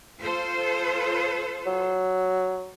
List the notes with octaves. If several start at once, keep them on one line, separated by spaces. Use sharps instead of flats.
F4 A4 C5
F#3